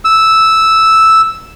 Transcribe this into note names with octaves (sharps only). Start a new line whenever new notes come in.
E6